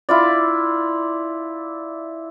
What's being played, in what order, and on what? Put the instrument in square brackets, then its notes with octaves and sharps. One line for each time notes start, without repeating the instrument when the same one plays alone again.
[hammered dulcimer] E4 F4 D5